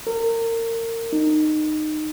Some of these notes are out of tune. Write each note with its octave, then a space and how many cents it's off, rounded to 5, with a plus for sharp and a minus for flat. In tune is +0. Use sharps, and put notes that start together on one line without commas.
A#4 -30
D#4 -20